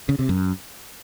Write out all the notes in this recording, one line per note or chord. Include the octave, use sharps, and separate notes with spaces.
C#3
C3
F#2